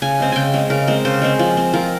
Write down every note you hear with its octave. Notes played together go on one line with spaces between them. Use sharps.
C#3 G#5
G#3 C4
C#3 G5 G#5
G#3 C4
C#3 A#4
G#3 C4
C#3 C5
G#3 C4
F3
C4
F3 A#4